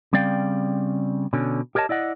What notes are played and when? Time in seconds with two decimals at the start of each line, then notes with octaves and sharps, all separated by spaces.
0.13 C#3 G3 C4 D5 F5 G5
1.33 B2 D3 C#4
1.75 G4 A#4 C#5 D#5 A5
1.89 E4 D5 D#5 F#5